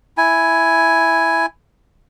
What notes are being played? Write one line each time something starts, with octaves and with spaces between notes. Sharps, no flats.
E4 G#5